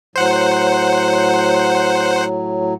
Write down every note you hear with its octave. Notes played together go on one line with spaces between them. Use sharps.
A2 F#3 C5 F#5